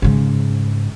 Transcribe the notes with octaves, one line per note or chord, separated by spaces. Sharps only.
G#2 C#3